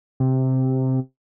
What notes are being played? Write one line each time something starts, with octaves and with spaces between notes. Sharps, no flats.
C3